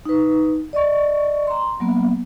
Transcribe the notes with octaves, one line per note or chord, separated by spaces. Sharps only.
D#4 B4
D5 D#5 C#6
A#5 C6
F#3 A#3 B3